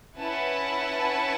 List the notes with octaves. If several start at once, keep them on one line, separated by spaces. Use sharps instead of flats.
C#4 E4 B4 F#5 A5